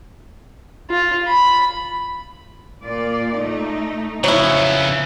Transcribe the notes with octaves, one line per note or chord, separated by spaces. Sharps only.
F4
B5
A#2 F4 D5
A3 D#4
F2 C#3 F#3 B3 E4